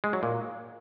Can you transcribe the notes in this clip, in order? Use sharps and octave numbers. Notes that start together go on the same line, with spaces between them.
G#3
F#3
A#2